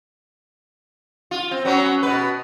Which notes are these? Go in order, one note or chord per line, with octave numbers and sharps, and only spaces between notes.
F4
C4
F#3 B3 C#4
B2 B4